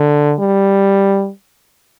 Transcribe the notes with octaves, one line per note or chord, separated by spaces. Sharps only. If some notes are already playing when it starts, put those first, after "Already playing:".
Already playing: D3
G3